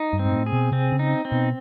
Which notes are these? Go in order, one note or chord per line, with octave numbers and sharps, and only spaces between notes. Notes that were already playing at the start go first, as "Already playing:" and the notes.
Already playing: D#4
G2
C4
G#2
A2
G#4
B2
C3 C4
C#3
D#4
C4
B2